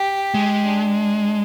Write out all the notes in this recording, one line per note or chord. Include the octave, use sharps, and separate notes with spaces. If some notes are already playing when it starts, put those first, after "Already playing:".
Already playing: G4
G#3
D4